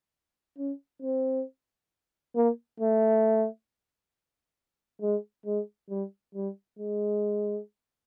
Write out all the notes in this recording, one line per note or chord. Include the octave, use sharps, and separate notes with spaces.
C#4
C4
A#3
A3
G#3
G#3
G3
G3
G#3